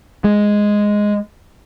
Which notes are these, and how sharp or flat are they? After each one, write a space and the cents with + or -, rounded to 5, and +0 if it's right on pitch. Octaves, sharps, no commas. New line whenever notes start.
G#3 +0